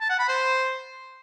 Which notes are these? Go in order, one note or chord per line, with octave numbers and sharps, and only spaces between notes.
A5
F#5
B5
C5